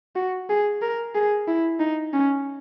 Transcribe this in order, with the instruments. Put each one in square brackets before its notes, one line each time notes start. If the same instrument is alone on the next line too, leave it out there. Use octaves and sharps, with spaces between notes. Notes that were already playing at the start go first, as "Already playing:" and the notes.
[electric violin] F#4
G#4
A#4
G#4
E4
D#4
C#4